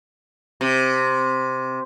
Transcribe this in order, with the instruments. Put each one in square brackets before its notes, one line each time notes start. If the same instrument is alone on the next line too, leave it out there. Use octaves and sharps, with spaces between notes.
[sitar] C3